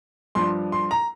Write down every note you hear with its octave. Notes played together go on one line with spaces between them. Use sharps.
G2 F3 D4 C6
C6
A#5